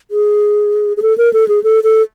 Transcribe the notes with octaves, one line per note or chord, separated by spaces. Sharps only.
G#4
G#4
A4
A#4
A4
G#4
A4
A4